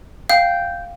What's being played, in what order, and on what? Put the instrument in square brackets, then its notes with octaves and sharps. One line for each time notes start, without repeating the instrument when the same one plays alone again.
[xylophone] F5 [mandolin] G5